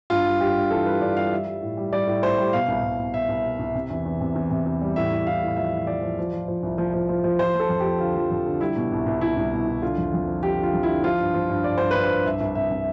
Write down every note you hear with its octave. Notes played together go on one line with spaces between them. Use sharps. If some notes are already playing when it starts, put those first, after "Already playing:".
G2 F4
G3
G2 G4
G2
E3 A4
G3 B4
G2 D5
G3 F5
G3 E5
G3
A2
G3
G3 D5
A2
A2 C5
G3
B2 F5
C2
C2
B2
B2 E5
C2
B2
C2
C3
E2
E2
C3
E2
C3
E2
G3
A2 E5
A2
A2 F5
A2
F3 E5
F3
F3 D5
F3
F3
F3
F3
C2
F3
F3
F3
F3
F3 C5
F3
A4
F2
F3 G4
D3 F4
F3
F2
D3
G3 E4
B2
C2
C2
C2 E4
C2
B2
C2
D3 F4
F2
F2
F3
F3 G4
D3 F4
F2
E4
D3
F3 F4
G2
F3
G2
G2 D5
G2 C5
G2 B4
C5
G2
C2 E5
C2
C3 E5
C3